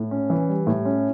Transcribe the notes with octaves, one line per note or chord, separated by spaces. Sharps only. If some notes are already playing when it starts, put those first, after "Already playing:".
Already playing: A2
C#4
E3
G3
A2
C#4